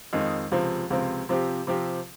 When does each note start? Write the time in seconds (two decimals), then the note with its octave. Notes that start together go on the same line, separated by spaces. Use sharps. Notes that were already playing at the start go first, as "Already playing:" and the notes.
0.13 F2 D#3 G#3 D#4
0.52 C#2 C3 F3 C4
0.90 C#2 C3 F3 C4
1.29 C3 F3 C4 G4
1.67 C3 F3 C4 G4